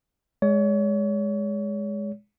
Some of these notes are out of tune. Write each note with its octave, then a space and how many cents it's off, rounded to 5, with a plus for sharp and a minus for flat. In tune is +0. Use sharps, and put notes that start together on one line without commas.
G#3 +0 C#5 +35